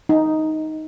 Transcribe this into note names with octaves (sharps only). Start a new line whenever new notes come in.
D#4